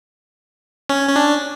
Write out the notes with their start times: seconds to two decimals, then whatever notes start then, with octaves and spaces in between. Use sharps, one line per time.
0.89 C#4
1.09 C#4
1.16 D4